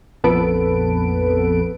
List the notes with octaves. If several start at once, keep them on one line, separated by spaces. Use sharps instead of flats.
A#1 F2 B3 A4 B4 D7